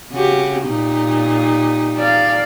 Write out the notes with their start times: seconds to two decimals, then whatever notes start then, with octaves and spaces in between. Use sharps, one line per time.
0.12 C#3 F#4 G4
0.66 A#2 D#4 G4
1.98 D5 F5